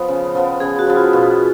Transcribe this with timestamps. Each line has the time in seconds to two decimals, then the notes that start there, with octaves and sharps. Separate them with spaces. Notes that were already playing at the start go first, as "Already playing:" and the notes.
Already playing: F3 B3
0.08 C#3
0.35 F3 B3
0.60 C#3 G#4
0.79 F#4
0.87 F3 B3
0.96 F4
1.13 B2